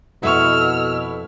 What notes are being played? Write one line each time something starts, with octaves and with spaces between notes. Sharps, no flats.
F2 B2 A3 E4 F#5 C#6 E6 F6